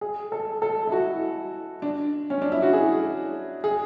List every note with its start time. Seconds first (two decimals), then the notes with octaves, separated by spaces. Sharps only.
0.01 G#4
0.32 A4
0.62 A4
0.87 E4
0.92 F#4
1.82 D4
2.30 C#4
2.42 D4
2.52 E4
2.62 F#4
2.73 G#4
3.64 G#4